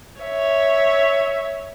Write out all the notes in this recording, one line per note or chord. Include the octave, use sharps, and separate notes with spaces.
C#5 E5